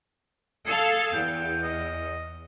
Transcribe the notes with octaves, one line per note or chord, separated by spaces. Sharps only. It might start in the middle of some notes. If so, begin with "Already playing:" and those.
G#4 A4 F5
E2 G5
D#5